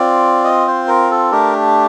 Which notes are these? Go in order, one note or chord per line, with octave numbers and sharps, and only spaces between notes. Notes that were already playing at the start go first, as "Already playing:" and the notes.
Already playing: C4 F4 D5
D#5
C5
A#4
A4
A3 D4 G4 A#4